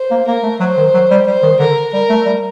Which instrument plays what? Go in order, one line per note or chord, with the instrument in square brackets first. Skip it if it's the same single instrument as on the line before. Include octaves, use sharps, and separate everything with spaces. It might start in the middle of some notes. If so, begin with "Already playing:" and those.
Already playing: [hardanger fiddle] C5
[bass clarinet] A#3
[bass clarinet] A#3 [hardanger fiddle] A#4
[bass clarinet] A3
[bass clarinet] F#3 [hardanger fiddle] C5
[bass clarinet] D#3
F#3
G3
[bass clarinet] G3 [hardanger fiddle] C5
[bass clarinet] D#3
[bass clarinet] D3 [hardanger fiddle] A#4
[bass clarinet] G3 [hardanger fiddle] A#4
[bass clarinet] A3
G3